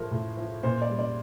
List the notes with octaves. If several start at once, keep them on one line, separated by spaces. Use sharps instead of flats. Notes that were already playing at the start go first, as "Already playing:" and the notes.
Already playing: A2 F3 A#4 C5
A2
F3
A#2 C5
D5
G3
D5